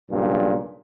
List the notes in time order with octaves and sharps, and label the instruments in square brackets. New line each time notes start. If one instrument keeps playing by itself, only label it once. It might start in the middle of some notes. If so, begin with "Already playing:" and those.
[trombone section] B1 G2 A#2 C#3